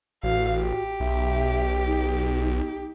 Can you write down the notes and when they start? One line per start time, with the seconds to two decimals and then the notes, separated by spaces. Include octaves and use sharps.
0.23 A1 F#4 F5
0.61 G4
1.00 B1 E5
1.86 D#4